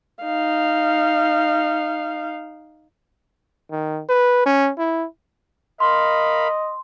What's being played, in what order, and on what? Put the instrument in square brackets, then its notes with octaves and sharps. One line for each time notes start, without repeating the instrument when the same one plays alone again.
[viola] D#4 F5
[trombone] D#3
B4
C#4
E4
[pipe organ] A#4 F5 B5 [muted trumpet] D#5 [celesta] C6